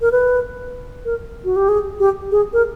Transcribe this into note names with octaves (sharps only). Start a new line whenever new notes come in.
A#4
B4
A#4
F#4
G4
G#4
G4
G#4
A#4